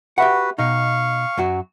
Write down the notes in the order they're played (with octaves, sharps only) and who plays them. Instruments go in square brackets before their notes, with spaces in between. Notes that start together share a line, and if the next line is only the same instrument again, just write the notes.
[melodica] F#4 B4 [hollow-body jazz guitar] G4 E5 F#5
[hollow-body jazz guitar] B2 D#4 [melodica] F5 C#6
[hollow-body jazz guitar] F#2 F#3 F#4